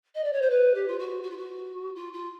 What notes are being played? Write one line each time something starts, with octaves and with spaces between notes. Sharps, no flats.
D#5
D5
C#5
C5
B4
G4
F4
F#4
F#4
F4
F#4
F4
F4